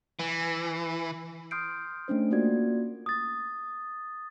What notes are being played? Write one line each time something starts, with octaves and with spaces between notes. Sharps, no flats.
E3
C6 D#6 F6 G6 C7 D7
A3 C#4 D4 C5
A#3 F4 F#4 A#4 D5 G#6
D#6 A6